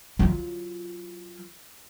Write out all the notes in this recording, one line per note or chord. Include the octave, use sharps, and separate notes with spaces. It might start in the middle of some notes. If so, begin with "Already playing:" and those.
F#3 F4